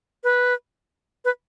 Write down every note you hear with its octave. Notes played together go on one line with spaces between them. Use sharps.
B4
B4